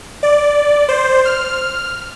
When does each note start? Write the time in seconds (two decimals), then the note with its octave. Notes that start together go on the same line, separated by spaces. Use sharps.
0.23 D5
0.89 C5
1.25 F6